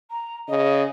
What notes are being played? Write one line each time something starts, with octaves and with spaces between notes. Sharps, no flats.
A#5
C#3 D#5